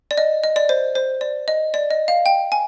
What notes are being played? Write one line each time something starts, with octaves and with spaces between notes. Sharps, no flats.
D5
D#5
D#5
D5
C5
C5
D5
D#5
D5
D#5
F5
G5
G#5